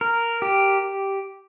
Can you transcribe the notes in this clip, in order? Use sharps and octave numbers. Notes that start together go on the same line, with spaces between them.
A#4
G4